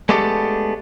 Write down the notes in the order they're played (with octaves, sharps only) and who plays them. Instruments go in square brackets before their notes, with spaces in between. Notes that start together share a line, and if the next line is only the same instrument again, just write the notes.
[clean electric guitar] G#3 A3 B3 D4 G4 A4